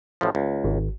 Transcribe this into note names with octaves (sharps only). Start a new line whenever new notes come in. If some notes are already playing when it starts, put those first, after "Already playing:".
A1 A2 F3
C#2
G#1